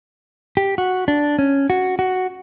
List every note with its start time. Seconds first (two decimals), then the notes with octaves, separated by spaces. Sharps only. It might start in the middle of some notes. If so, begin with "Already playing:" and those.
0.57 G4
0.78 F#4
1.08 D4
1.39 C#4
1.70 F#4
1.99 F#4